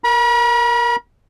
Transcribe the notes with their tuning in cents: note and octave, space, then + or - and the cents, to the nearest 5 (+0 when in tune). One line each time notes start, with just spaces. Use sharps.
A#4 +0 B5 -45